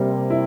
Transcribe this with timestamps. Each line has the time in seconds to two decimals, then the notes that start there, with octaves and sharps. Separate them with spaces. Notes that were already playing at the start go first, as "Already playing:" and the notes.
Already playing: C3 G3 A#3
0.30 E4